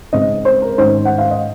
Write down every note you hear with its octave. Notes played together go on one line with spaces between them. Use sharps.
C#3 G#3 C4 D#4 D#5
C5
A#4
G#2 D#3 G#3 C#4 C5
F#5
F5
D#5